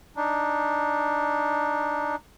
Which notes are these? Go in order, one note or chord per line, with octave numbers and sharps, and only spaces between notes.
D4 D#4